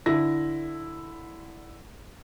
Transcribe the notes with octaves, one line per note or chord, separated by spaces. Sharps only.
D3 E4 A#6